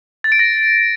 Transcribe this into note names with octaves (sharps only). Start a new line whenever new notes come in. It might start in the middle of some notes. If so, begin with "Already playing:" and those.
A6
D7
A#6